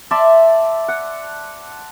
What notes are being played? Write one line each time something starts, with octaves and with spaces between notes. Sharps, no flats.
D5 E5 A5 C6
F#5